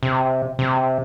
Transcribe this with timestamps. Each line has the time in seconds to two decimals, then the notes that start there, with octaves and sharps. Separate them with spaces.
0.03 C3
0.59 C3